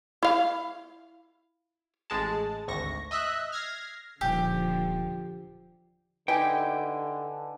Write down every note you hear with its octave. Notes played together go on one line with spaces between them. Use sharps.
E4 F5
A1 G#3 A5
G#1 D2 C#6 A#6
D#5 E5 E6 F#6
F6 G#6 A#6 C7
D#1 D3 F3 G4
D3 D#4 E4 G4 B4 G5 G#5